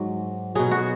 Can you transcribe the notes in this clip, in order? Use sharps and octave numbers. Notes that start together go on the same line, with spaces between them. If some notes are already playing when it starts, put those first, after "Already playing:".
Already playing: G#2 F#3
B2 F#3 G#4
F#4